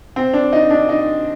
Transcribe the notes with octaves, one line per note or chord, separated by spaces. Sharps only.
C4
D4
D#4
D4
D#4